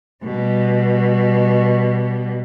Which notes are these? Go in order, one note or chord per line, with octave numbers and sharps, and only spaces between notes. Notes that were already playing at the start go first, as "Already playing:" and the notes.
B2 G3